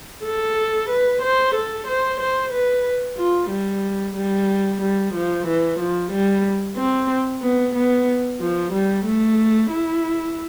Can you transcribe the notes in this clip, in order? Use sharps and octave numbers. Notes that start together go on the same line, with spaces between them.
A4
B4
C5
A4
C5
C5
B4
F4
G3
G3
G3
F3
E3
F3
G3
C4
B3
B3
F3
G3
A3
E4